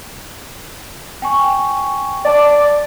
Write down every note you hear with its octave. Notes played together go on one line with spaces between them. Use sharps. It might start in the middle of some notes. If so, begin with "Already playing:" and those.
G5 G#5 C#6
D5 A5 A6